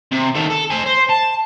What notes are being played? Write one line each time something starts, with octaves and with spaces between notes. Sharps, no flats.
C3
D#3 A4
A4
C5 G#5
C5
A5